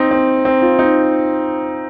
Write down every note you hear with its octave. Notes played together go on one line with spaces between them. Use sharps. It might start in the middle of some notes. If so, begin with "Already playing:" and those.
Already playing: C4 D#4
C4
C4
F4
D#4